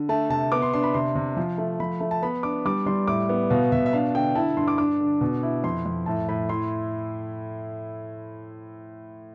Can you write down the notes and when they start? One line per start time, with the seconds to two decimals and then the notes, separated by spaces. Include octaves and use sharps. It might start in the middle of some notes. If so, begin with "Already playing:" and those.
Already playing: D3
0.09 A3 A5
0.30 C3 A5
0.52 B3 D6
0.62 C6
0.73 D4 C6
0.84 B5
0.94 C3 C6
1.15 C3
1.37 F3
1.58 A3
1.80 F3 B5
2.00 A3
2.11 A5
2.22 B3 B5
2.43 D4 D6
2.65 G3 D6
2.86 G3 C6
3.08 A2 D6
3.29 B3
3.50 B2 F5
3.72 B2 E5
3.86 E5
3.93 D4 F5
4.15 D3 G5
4.35 E4 A5
4.57 G2 C6
4.68 D6
4.78 D4 D6
5.00 D3
5.21 B2
5.43 E4
5.64 F2 C6
5.86 F2
6.06 A2 A5
6.28 A2 B5
6.49 E4 C6